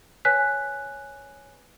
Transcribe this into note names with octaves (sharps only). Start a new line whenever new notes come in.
B4 C#5 G#5 F#6 B6